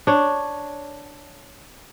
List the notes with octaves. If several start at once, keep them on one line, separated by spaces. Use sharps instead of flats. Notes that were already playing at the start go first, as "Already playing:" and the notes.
D4 C#5